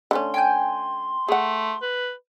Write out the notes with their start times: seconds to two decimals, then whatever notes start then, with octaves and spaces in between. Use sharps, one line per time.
0.11 D3 A3 C#4 C6
0.34 G5 G#5 G6
1.28 A3 G#4 F#5
1.82 B4